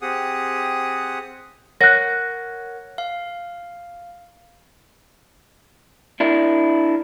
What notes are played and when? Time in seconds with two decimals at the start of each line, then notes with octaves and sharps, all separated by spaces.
0.02 C4 G4 G#4 F#5 D#6
1.81 A#4 C#5 F#5 F#6 A#6
2.98 F5
6.20 D4 E4 A#4